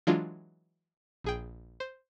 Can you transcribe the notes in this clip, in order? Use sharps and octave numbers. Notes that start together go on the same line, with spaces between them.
E3 F#3 G#3 D4 F4
A#1 G#4 G5
C5